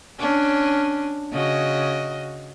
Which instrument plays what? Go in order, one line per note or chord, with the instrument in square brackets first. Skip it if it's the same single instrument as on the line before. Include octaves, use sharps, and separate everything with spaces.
[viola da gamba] C#4 D4
C#3 F#4 D#5